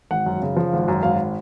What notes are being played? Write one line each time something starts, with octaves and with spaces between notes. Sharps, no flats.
G#1 F#5
F#2
C#3
F3
G#1
F#2
G#1 F5